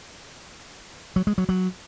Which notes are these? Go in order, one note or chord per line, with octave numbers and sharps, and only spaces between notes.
F#3
G#3
F#3
F#3